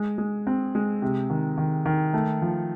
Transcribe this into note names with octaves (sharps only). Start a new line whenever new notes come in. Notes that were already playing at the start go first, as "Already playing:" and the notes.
Already playing: G#3
G#3
C4
G#3
C3
D#3
D#3
D#3
A3
F3